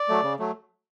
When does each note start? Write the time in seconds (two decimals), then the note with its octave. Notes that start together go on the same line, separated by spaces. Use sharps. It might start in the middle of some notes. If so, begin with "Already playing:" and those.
Already playing: D5
0.09 F#3 A3
0.23 C#3
0.39 F#3 A3